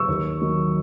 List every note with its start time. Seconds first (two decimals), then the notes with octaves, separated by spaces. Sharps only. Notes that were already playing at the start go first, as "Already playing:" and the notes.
Already playing: C#6 E6
0.08 D#2
0.42 D#3 F#3